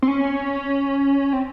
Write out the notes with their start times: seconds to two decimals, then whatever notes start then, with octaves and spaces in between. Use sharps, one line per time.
0.02 C4
0.08 C#4
1.33 C4